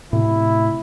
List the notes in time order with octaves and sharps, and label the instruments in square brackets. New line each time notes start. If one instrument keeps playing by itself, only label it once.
[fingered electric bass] A2 C3 [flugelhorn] E4